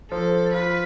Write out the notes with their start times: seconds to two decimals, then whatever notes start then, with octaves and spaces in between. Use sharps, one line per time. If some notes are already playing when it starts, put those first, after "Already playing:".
0.11 F3 A4
0.53 F4 B4